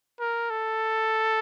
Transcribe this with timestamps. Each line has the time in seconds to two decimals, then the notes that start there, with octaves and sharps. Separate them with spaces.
0.20 A#4
0.50 A4